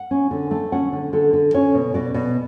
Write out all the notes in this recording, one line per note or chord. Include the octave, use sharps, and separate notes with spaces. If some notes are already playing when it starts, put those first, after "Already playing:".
Already playing: F#5
C#4
D3
A3
C#4 F#5
D3
D3 A4
D3
C#4 C#5
B2
B2 D5
B2